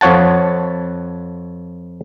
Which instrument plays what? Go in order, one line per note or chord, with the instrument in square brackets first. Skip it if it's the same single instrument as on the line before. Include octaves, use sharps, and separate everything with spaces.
[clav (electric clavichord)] F2 F3 C#5 F#5 A5